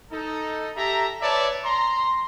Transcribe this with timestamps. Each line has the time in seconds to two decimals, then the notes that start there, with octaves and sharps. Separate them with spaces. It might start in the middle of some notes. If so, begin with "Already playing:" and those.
0.12 D#4 A4
0.76 G4 A4 E5 A#5
1.21 B4 C#5 D5 E5 A5
1.64 A#5 C6